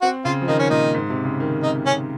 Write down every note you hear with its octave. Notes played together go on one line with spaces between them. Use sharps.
C4 F#4
C#3 F4
F3
D#3 D#4
C#4
A#2 D#4
G#2
C3
C#3
D#3
C3 D#4
C#4